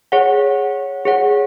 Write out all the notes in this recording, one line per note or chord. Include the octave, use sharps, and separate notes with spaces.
G#4 C#5 F#5
G#4 C#5 F#5